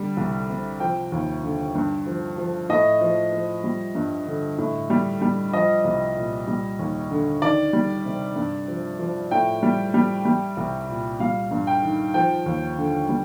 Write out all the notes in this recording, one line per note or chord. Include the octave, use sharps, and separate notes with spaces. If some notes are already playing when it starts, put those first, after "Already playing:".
Already playing: D3 G3
C2
C3
F3 G5
D#2
D3
G2
F3
F3
A2 D#5
F3
F3
G3
G2
D3
A2
G3
G3
F3 D#5
C2
A#2
G3
D#2
D3
D#3 D5
G3
C3
G2
F3
F3
A2 G5
G3
G3
G3
C2
A#2
G3 F5
G2
G5
D#3
F3 G5
D#2
D3
G3